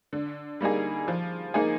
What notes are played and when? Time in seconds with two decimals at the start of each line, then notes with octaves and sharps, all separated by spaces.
0.13 D3
0.61 G3 A#3 D#4 G#4
1.08 F3
1.54 A#3 D#4 G#4